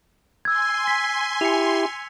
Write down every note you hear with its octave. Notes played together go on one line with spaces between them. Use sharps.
G#5 C6 E6 G#6
B6
E4 G4 C#7 F7